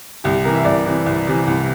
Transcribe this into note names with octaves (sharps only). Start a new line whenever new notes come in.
C2 G4
C3 E3 A#4
E5
C2 D5
C3 E3
C2
C3 E3
C2